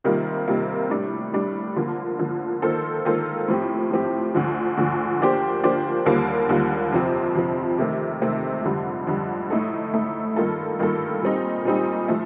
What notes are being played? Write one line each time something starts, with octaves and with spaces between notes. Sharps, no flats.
C3 D#3 G3 A#3 F4
C3 D#3 G3 A#3 F4
A2 G3 D4
A2 G3 D4
D3 F3 A#3
D3 F3 A#3
D#3 A#3 F4 A4 C5
D#3 A#3 F4 A4 C5
A2 F3 C4 G4
A2 F3 C4 G4
D2 D3 F3
D2 D3 F3
F3 A#3 D4 G4 C5
F3 A#3 D4 G4 C5
D#2 D3 G3 A#3 F4
D#2 D3 G3 A#3 F4
F2 C3 F3 C4
F2 C3 F3 C4
C3 D#3 A3 C4
C3 D#3 A3 C4
F2 D3 G3
F2 D3 G3
A2 A3 D#4 A4
A2 A3 D#4 A4
G2 D#3 A#3 F4 A4
G2 D#3 A#3 F4 A4
A#2 G3 C4 D#4
A#2 G3 C4 D#4
F3 A3